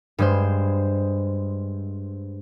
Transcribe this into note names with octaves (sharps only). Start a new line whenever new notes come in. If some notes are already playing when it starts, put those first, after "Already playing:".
G2 G#3 C5